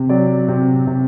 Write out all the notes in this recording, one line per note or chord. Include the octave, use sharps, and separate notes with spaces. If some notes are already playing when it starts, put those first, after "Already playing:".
Already playing: C3
F#3 D5
C3
C3